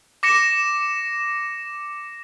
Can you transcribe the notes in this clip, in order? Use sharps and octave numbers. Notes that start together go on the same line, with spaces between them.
D6 A#6 C#7 E7